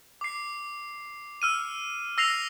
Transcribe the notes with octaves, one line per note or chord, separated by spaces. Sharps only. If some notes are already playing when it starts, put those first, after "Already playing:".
D6 C7
E6 F6 D#7
E6 A#6 C7 F7